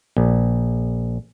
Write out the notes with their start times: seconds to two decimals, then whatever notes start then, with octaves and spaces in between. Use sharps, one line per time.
0.17 A#1